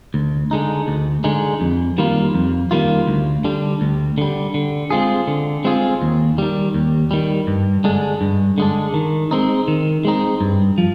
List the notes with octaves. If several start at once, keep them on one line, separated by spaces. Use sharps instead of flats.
D2
D3 G#3 D#4
D2
D3 G#3 D#4
F2
D#3 G3 A#3 F4
F2
D#3 G3 A#3 F4
D2
D3 G3
D2
D3 G3
D3
G#3 C4 F4 G#4
D3
G#3 C4 F4 G#4
D#2
D#3 G3
D#2
D#3 G3
G2
D3 G#3 D4
G2
D3 G#3 D4
D#3
G#3 C4 D#4
D#3
G#3 C4 D#4
G2
F3